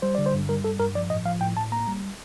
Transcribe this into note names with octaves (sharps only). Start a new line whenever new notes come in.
G3 C5
D3 D5
C5
G2
G3 A#4
G2 A4
G2 A#4
F3 D5
A2 D#5
F3 F5
A2 G5
A2 A5
A#3 A#5
G3